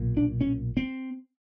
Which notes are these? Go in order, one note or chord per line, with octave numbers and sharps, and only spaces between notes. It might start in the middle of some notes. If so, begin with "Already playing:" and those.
Already playing: B1 A#2
D4
C#4
C4